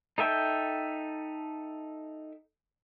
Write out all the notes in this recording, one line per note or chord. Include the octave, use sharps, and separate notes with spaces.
D#4 A4 E5 G5